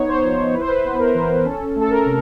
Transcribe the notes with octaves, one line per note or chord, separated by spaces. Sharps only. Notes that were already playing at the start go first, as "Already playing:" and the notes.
Already playing: B3 D#4 C#5
C5
F3
E4 B4
C5
B4
B3
A#4
E3
C#4 A4
A3
A4
A#4
C3